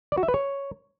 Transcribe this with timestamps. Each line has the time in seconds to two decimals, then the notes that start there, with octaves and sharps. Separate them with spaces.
0.12 D5
0.17 F#4
0.23 E5
0.28 B4
0.34 C#5